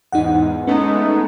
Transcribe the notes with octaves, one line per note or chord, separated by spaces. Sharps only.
E2 G#2 D#4 F#5
G#3 A3 B3 C#4 D#4